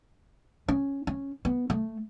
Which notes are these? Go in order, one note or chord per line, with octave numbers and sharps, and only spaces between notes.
C#4
C#4
B3
A3